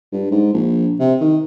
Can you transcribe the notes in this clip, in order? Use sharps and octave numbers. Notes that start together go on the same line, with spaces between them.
G2
G#2
A#1
C3
D#3